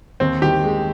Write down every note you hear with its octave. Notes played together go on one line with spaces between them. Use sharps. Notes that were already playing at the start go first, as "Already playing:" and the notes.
D#2 C4
D#3 G4
G#3